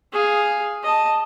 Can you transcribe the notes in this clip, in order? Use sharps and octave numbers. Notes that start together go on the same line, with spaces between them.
G#4 F5
D#5 A5